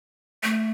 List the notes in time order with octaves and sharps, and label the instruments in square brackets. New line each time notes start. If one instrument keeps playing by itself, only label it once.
[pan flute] A3